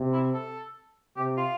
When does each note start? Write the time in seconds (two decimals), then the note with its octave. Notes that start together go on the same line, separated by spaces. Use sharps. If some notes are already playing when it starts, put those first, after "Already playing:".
Already playing: C3
0.14 E4
0.34 A4
1.17 C3 G4
1.37 F4